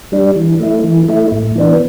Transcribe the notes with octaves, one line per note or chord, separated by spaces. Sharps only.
G3 D4
E3
A3 E4
E3
A3 E4
A2
E3 B3 D4